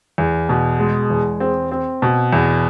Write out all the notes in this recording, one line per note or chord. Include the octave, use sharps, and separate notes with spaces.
E2
B2
G#3
E2
C4
C4
B2
E2